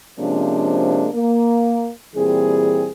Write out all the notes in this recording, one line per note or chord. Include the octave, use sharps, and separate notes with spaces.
C3 F3 G#3 A#3 C#4 D4
A#3
A#2 E3 G3 C4 G#4